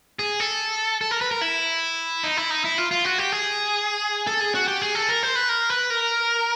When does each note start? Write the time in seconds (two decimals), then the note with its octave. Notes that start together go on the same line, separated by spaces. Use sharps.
0.19 G#4
0.40 A4
1.01 A4
1.11 A#4
1.21 B4
1.31 A#4
1.41 E4
2.23 D#4
2.37 E4
2.50 D#4
2.64 E4
2.78 F4
2.91 F4
3.05 F#4
3.18 G4
3.32 G#4
4.27 A4
4.41 G#4
4.55 F#4
4.68 G4
4.82 G#4
4.95 A4
5.09 A#4
5.23 C5
5.36 B4
5.49 A#4
5.70 B4
5.90 A#4